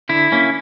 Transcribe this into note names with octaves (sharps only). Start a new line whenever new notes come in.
D3 E4
A#3 C#4